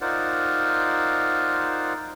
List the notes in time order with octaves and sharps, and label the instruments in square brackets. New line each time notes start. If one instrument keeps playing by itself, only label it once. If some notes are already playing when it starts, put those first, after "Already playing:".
[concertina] D#4 F4 A#4 C5 D5 F#5